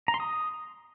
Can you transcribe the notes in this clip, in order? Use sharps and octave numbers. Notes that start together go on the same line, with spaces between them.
A#5
C6
D#6